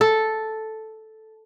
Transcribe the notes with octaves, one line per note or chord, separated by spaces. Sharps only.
A4